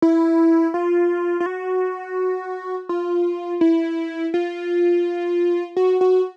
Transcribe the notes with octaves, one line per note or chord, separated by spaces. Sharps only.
E4
F4
F4
F#4
F4
E4
F4
F#4
F#4